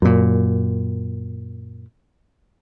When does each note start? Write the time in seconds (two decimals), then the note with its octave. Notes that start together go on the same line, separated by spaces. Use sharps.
0.02 F#2 A#2